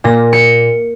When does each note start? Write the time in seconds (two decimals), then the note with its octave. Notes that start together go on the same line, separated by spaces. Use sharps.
0.04 A#2 A#6
0.33 C#7